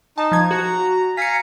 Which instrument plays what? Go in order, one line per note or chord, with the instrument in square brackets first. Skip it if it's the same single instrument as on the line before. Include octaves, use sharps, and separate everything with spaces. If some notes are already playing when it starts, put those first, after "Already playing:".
[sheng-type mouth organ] D#4 [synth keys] A5
[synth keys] F3 G#6
[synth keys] F#4 [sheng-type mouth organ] A#5
[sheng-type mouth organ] F5 G#5 A#5 [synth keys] B6 C#7